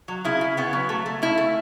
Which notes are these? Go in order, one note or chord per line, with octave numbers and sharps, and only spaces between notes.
F#3
C#3 E4
C#3
C#3 B3
F#3
F#3 A3
A3
C#3 E4
A3